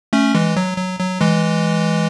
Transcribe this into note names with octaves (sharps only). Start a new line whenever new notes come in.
A3 C#4
E3 G#3
F#3
F#3
F#3
E3 G#3